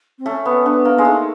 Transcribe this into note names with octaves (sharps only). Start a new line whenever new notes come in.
C4
A3 C#4
B3
B3 D4
A#3
G#3 D4
A3 D#4